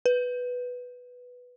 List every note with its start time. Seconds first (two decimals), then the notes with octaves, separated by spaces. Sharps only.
0.06 B4